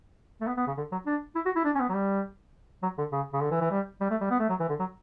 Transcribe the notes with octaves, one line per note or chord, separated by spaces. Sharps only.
A3
B3
B3
C#3
D3
F#3
D4
E4
F#4
E4
D4
C#4
B3
F#3
G3
F#3
D3
C#3
C#3
D3
E3
E3
G3
G3
A3
G3
B3
A3
F#3
E3
D3
F#3